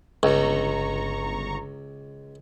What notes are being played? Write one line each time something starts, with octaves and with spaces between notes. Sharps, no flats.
G1 C#2 A#5 C#6